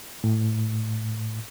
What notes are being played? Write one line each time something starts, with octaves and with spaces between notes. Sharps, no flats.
A2